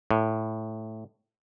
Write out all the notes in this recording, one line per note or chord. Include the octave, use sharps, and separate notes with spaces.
A2